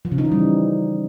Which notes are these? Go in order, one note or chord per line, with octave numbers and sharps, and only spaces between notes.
F3
C#3
D#4
E3
G3